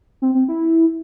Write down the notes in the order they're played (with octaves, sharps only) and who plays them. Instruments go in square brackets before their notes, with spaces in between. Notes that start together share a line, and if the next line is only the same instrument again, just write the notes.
[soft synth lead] C4
C4
E4